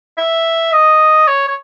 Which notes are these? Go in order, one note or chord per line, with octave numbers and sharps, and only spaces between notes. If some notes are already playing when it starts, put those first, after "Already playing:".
E5
D#5
C#5
C#5